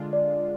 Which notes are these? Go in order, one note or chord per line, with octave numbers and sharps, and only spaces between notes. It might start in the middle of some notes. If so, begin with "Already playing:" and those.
Already playing: D3 G#3 D4 F4
D5